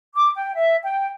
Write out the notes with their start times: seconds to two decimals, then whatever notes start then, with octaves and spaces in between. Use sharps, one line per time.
0.15 D6
0.36 G5
0.56 E5
0.84 G5